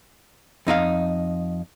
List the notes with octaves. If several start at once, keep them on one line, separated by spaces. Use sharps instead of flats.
F2 D#4 E4 F5